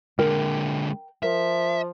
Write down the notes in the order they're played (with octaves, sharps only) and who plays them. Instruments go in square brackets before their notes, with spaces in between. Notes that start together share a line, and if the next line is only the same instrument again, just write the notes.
[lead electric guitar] D3 G#3 [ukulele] A#4 G5
[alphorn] F3 [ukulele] A#4 [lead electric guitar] E5